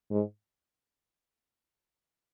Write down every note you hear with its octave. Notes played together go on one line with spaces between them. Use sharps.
G#2